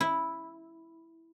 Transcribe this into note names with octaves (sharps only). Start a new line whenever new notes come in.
E4